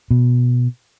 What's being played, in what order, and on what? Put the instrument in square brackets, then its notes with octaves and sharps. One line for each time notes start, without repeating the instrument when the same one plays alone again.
[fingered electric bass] B2